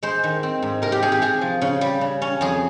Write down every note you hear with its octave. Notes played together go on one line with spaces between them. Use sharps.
G#3 C5
D#3
C4
G#2
C3 A#4
G4
C3 G#4
G4
C3 G#4
F3
C#3
G3
C#3
C#4
F2 G#4